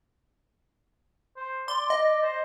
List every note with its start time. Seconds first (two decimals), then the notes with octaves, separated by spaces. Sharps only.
1.37 C5
1.68 D5 C6
1.90 D#5
2.23 C5